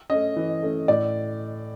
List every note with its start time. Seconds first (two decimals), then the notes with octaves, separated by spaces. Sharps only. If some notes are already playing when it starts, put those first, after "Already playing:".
0.10 A3 C#4 D#5
0.36 E3
0.63 A3 C#4
0.88 A2 D5